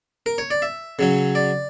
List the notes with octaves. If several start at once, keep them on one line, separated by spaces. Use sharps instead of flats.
A#4
C#5
D5
E5
C#3 F#3 C#4
D5